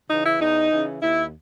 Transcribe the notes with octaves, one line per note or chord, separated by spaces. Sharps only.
C#3 E3 D#4
E4
E2 D#4
C#3 E3
D#2 E4